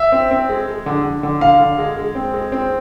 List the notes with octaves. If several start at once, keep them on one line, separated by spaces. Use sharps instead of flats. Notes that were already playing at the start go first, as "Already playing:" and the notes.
Already playing: E5
C4
C4
G#3
G#3
D3
D3
D3
D3 F5
D3
G#3
G#3
C4
G#3
C4